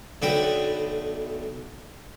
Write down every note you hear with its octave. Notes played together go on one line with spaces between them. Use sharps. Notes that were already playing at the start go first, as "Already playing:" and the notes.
B1 D3 A3 B3 F#4 G5